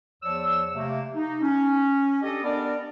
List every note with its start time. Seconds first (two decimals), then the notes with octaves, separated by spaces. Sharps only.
0.23 E2 F3 C#5 D5 E6
0.75 C3 A3 A#3
1.16 D#4
1.42 C#4
2.22 D4 G4 A4 D#5
2.44 B3 D4 A#4 D5